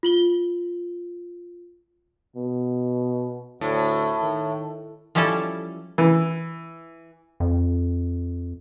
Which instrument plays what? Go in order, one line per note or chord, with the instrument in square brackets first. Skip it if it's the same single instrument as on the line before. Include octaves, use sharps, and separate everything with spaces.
[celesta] F4 F#7 G7
[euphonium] B2
[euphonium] D2 [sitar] A2
[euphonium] D#3
[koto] F3 G3 C#4 E4 A4
[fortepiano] E3
[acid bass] F2